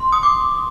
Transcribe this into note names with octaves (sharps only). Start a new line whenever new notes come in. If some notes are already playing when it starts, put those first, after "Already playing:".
Already playing: C6
D#6
D6